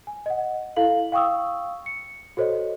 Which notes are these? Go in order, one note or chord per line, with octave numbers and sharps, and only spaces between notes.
G#5
D#5 F#5
E4 A4 F5 F#7
F5 G5 C#6 D#6 E6
C#7
F#4 A4 C5 C#5 D#5